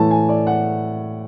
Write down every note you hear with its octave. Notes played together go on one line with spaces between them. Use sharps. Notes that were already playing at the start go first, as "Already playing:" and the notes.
Already playing: A2 E3 A3 A5
G#5
D5
F#5